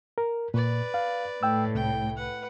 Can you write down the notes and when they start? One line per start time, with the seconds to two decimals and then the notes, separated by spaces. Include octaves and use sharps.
0.18 A#4
0.54 A#2 B4 D5
0.94 F5
1.43 A2 G5 E6
1.75 C2 G5
2.17 B4 F#5